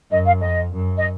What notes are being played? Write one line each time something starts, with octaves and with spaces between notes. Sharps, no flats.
F#2 D#5
F5
F2 D#5
F#2
D#5